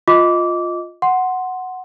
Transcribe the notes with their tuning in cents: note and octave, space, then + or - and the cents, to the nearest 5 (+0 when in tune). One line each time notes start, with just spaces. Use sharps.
F4 +10 D#5 +10 D6 -20
F#5 +0 C6 +0